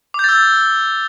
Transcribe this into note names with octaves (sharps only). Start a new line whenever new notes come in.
D6 E6 G6 A6